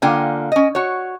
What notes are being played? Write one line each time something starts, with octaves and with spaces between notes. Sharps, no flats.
D3 A#3 F4 G5 G#5
C#4 D#5
F#4 C#5